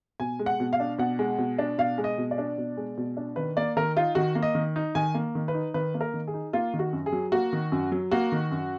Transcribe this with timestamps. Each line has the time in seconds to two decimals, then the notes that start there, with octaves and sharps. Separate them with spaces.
0.20 B2 G#5
0.39 G#3
0.46 F#5
0.60 B2
0.73 F5
0.80 D4
0.98 B2 F#5
1.19 G#3
1.38 B2
1.59 D4
1.78 B2 F5
1.98 G#3
2.04 D#5
2.18 B2
2.31 D5
2.38 D4
2.58 B2
2.77 G#3
2.98 B2
3.17 D4
3.36 D#3 B4
3.57 A#3 D5
3.76 D#3 A#4
3.96 D#4 F4
4.15 D#3 F#4
4.35 A#3
4.43 D#5
4.55 D#3
4.76 D#4
4.95 D#3 G#5
5.14 A#3
5.35 D#3
5.48 B4
5.54 D#4
5.74 D#3 B4
5.94 A#3
6.01 A#4
6.14 D#3
6.27 G#4
6.34 D#4
6.53 A#3 F4
6.74 D#3
6.79 F#4
6.93 F#2
7.06 G#4
7.12 F#3
7.32 A#3 F#4
7.53 D#3
7.72 F#2
7.92 F#3
8.11 A#3 F#4
8.32 D#3
8.51 F#2